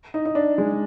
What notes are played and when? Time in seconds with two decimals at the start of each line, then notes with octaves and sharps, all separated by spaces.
0.14 D#4
0.25 D#4
0.35 D4
0.58 G#3